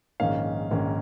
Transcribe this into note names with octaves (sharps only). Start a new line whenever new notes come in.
A#1 G#2 D#3 A#3 C#4 F5
A#1 G#2 D#3 A#3 C#4